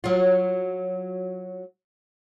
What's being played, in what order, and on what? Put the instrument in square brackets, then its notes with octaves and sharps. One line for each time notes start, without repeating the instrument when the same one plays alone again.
[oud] F#3 F4